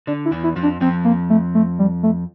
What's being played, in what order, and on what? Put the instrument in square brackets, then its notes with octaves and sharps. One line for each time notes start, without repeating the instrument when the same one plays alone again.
[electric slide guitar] D3 [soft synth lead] D4
[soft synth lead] E4
[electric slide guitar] E2 E3
[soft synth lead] E4
[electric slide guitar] F2 F3
[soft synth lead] D4
[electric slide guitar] F2 F3 [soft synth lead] C4
[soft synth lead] A#3
A3
A3
G3
A3